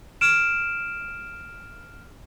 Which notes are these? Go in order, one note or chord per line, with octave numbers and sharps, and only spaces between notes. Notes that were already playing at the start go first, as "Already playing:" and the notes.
F6 D7 E7